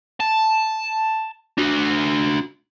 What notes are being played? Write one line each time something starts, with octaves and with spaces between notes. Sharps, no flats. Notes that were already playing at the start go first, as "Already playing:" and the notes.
A5
D4 F#4